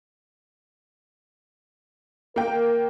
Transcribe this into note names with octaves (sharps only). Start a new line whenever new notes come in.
A#3 A#4 G5